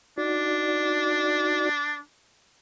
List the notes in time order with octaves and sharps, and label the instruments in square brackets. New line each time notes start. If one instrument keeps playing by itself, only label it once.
[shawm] D4 [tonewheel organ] D#4 F#4 D5